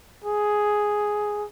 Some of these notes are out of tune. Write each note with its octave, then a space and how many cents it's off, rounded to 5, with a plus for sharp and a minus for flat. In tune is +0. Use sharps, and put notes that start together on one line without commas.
G#4 +5